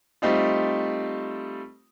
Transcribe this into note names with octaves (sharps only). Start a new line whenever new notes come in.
G3 A3 C4 D#4 F4